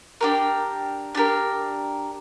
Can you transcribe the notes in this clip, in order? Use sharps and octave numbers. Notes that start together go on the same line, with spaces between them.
D4 G4 A#4
D4 G4 A#4